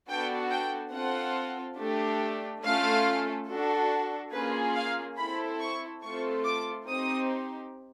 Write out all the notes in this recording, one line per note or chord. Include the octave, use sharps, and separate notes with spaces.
B3 D4 F#4 A4 G5
G5
C4 F4 A4 F#5
A3 D4 G4
A3 C#4 F4 A4 F5
D4 F#4 A4
A#3 C#4 F4 G#4 B4
F5
C4 E4 A4 B5
C#6
A3 C4 F4 A4 C#6
D6
C4 D#4 G4 D#6